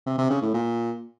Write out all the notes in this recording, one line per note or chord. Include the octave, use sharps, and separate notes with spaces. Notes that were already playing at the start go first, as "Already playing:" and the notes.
C3
C3
C#3
A2
A#2